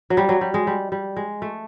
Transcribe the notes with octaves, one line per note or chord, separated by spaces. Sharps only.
F#3
G3
F#3
G3
G#3
G3
G3
G#3
A3